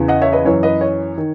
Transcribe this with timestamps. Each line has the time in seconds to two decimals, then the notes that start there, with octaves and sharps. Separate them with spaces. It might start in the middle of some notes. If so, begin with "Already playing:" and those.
Already playing: E2 C#3 E3
0.08 D#5 F#5
0.22 C#5 E5
0.32 B4 D#5
0.45 F#2 E3 C#5
0.63 B4 D#5
0.81 C#5
1.18 D#3